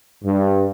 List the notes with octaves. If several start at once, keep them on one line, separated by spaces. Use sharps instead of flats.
G2